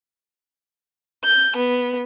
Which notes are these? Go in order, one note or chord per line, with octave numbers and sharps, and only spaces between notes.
G6
B3